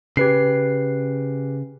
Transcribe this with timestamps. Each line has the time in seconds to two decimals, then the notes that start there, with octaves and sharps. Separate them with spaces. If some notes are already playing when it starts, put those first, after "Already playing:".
0.17 C#3 G4 B4 C7